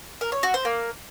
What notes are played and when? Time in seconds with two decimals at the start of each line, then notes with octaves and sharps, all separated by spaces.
0.21 A#4
0.32 C#5
0.43 F#4
0.54 C5
0.65 A#3